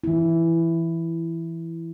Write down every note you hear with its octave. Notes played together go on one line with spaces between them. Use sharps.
E3 E4